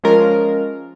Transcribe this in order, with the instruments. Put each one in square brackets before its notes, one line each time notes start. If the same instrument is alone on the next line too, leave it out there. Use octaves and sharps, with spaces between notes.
[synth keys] F3 G#3 C#4 F4 A#4